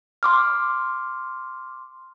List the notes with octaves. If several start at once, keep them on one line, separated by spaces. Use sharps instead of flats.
C6 D6 F6